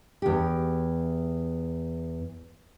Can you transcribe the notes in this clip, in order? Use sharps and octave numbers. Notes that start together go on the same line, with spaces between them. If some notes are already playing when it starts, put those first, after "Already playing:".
E2 G4